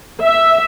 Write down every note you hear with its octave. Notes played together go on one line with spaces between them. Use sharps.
E5